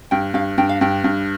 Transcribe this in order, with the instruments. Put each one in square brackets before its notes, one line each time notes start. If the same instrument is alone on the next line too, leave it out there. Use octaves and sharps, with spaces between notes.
[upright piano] G2 [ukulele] G5
[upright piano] G2 [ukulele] F5
[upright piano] G2 [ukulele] G5
[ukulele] F5
[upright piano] G2 [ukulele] G5
[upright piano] G2